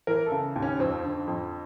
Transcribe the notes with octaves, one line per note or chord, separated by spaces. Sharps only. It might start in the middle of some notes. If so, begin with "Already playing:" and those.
E3 A#4
A4
C#3
D#2
C#4
F2 C4
D3
F2